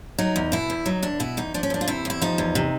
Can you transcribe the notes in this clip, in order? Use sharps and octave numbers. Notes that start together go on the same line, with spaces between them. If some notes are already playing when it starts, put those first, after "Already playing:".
F#3 D#4
E2
B2 E4
E2
F#3 D#4
E2 D4
B2 E4
E2 D#4
F3 D4
C#4
E2 D4
F4
C3 E4
E2 E4
F3 D#4
E2
C3